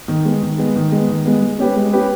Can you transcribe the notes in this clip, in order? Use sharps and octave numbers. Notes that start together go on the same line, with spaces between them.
D#3
G#3 B3
D#3
G#3 B3
D#3
G#3 B3
D#3
G#3 B3
G#3
C#4 G4 B4
G#3
C#4 G4 B4